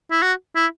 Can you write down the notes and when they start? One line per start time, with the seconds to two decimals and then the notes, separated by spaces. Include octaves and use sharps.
0.11 E4
0.22 F#4
0.56 E4